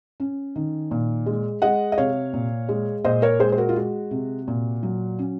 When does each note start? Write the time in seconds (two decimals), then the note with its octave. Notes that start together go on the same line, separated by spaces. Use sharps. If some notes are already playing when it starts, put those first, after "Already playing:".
0.20 C#4
0.56 D#3
0.91 A#2
1.26 G#3
1.62 G#3 D#5 F#5
1.92 D#5
1.98 C3 C#5 F5
2.33 A#2
2.69 G#3
3.04 A#2 C5 D#5
3.22 A#4 C#5
3.40 G#3 G#4 C5
3.52 C5
3.57 F#4 A#4
3.69 F4
3.76 G#3 F#4
4.11 C3
4.48 A#2
4.83 F#3
5.19 C#4